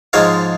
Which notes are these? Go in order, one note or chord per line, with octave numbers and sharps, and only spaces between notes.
G#2 F3 G#3 C#5 F5